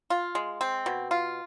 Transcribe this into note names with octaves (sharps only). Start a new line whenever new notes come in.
F4
G#3
C4
B2
F4